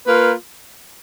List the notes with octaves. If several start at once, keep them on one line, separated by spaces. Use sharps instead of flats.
A#3 F4 B4